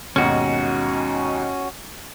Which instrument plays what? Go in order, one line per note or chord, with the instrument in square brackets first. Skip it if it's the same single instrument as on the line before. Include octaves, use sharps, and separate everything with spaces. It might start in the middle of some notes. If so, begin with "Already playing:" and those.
[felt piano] D#2 G#2 B2 [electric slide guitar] C#4 F#4